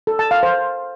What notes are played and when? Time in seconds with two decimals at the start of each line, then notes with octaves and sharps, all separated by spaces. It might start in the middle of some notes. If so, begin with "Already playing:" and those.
0.07 A4
0.19 A5
0.31 F5
0.43 C5